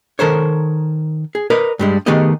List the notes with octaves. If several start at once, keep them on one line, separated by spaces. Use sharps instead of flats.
D#3 A4 A#4 C5 C#5
G#4
A#4 B4 D5 D#5
G2 G3 G#3
D#3 A3 B3 G4 G#4 D#5